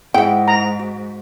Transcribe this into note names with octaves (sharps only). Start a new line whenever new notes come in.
G#2 E4 G#4 E5 F#5 G5
A#5
F#4